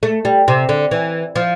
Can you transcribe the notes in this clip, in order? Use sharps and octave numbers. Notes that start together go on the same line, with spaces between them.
A3
G3
C3
D3
E3
F3